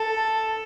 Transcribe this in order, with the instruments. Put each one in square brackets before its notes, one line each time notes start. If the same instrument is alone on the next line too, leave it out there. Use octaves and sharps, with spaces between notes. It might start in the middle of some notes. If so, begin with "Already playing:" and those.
Already playing: [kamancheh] A4